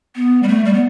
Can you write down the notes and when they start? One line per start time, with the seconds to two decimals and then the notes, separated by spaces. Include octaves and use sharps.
0.16 B3
0.43 G3
0.48 A3
0.65 G3
0.73 B3